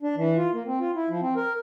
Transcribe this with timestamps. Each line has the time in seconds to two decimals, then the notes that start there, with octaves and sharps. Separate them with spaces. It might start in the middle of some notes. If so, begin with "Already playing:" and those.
0.02 D4
0.17 E3
0.37 F4
0.53 A#3
0.66 C4
0.80 F4
0.95 E4
1.10 F3
1.21 C4
1.36 A#4